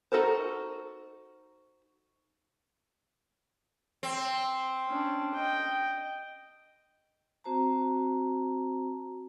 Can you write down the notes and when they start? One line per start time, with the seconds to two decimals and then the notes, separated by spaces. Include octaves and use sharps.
0.12 D#4 F#4 A4 A#4 C5
4.03 C4
4.88 C#4 D4
5.34 D#5 G5
7.44 C4 F#4 C5 A5 A#5